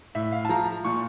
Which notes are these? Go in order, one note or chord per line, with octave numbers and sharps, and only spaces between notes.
A2 E5
F5
A5
F3 A#5
A#2 C#6